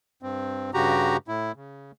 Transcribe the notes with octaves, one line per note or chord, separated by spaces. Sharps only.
G2 C4
G2 C#3 F#4 G4 A#5
A2 E4
C#3